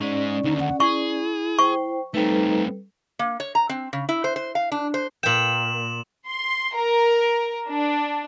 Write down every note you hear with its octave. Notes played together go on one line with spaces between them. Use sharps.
G#3 C#4 D#4 D5
D#2 D3 D#4
F#5
E4 G#4 C#6
C5 G5 C#6
G3 A3 C4 D#4 A4 B4
A#3
C#5
A#5
C4
C#3
E4
C5
C5
F5
D4
C5
A#2 G5 E7 F#7
C6
A#4
D4